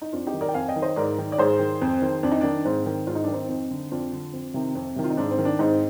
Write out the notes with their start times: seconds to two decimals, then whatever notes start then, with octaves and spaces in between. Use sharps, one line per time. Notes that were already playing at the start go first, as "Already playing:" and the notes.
0.02 D#4
0.12 F2 D4 F4
0.27 D#4 G4
0.34 D#3
0.41 A#4 D5
0.48 G5
0.54 F2 F5 G#5
0.68 D#5 G5
0.76 D#3
0.82 C5 D#5
0.96 G#2 A#4 D5
1.18 D#3
1.32 D5
1.38 G#2 G#4 C5
1.59 D#3
1.82 F2
2.02 D#3
2.23 F2 D4
2.32 D#4
2.41 D#3 D4
2.65 G#2 C4
2.86 D#3
3.07 G#2 F4
3.15 D#4
3.24 D4
3.28 D#3
3.33 C4 D#4
3.49 F2
3.71 D3
3.91 F2 D4 F4
4.13 D3
4.33 F2
4.54 C3 D#3
4.75 F2
4.96 C3 D#3
5.04 F4
5.10 D#4
5.17 G#2 D4
5.31 C4
5.39 D#3
5.45 D4
5.59 G#2 C4 D#4